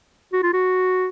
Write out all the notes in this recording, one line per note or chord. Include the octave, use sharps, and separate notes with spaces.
F#4
F4
F#4